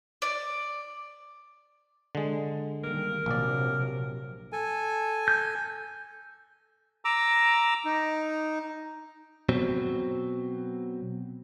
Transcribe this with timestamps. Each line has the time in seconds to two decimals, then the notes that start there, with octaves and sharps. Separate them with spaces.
0.22 D5
2.15 D3 G#3
2.84 D#3 G3 A#3 A#4
3.26 A#1 C3 F3 F#3 D5
4.52 A4 G#5
5.28 G6
7.05 A#5 D6 E6
7.85 D#4
9.49 B2 F#3 C4